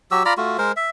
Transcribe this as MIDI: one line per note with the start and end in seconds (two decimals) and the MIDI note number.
0.11 0.23 54
0.11 0.23 66
0.11 0.23 67
0.11 0.23 88
0.25 0.33 65
0.25 0.33 74
0.25 0.33 82
0.25 0.33 83
0.37 0.57 57
0.37 0.57 65
0.37 0.57 66
0.58 0.72 56
0.58 0.72 70
0.58 0.72 72
0.76 0.90 76